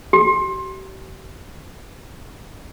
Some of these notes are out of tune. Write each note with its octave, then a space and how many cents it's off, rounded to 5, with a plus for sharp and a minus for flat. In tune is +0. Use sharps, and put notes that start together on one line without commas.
G4 -45